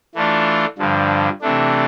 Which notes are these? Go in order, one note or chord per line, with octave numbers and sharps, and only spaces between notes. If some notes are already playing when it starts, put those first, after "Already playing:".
E3 A3 D4 F4
G2 D3 F3
C3 E3 A3 D4